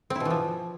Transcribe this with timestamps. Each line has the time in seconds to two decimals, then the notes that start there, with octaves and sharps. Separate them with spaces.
0.10 C4
0.15 E4
0.20 B2
0.25 E3
0.30 F3